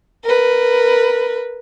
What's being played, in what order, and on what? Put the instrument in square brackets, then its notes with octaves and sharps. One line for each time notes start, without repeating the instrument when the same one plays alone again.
[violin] A#4 B4